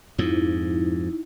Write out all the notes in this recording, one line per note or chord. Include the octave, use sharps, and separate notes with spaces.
F2 G#2 F3 D#4 E4